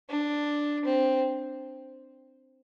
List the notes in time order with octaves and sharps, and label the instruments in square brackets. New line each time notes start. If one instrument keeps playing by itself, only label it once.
[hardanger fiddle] D4
C4